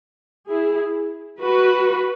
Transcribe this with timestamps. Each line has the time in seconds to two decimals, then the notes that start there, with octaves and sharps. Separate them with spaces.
0.51 E4 G#4
1.41 F#4 B4